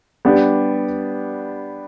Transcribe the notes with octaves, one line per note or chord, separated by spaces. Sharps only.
G3 B3 D4 G4